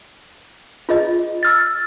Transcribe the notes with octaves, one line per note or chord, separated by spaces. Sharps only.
F4 G#4 D#5
E6 F6 A6